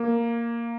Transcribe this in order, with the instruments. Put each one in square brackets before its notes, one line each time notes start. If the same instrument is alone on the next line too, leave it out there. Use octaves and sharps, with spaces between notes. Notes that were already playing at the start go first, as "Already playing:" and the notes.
Already playing: [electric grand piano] A#3